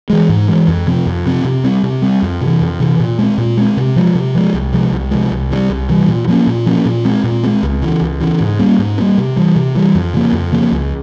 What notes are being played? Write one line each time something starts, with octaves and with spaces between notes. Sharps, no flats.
E3 G#3
G#2
E3 G#3
F2
C3 F3 C4
F2
C3 F3 C4
C3
G3 C4
C3
G3 C4
F2
C3 E3
F2
C3 E3
A#2
G#3 C4
A#2
G#3 C4
C3
F3 G#3
C3
F3 G#3
C2
C3 F3 G#3
C2
C3 F3 G#3
C2
C3 E3 G3
C2
C3 E3 G3
A#2
F3 A#3 C#4
A#2
F3 A#3 C#4
A#2
G#3 C4
A#2
G#3 C4
C#2
C#3 E3
C#2
C#3 E3
G#2
G3 A#3 C#4
G#2
G3 A#3 C#4
C3
E3 G3
C3
E3 G3
F2
C#3 F3 A#3
F2
C#3 F3 A#3
C#2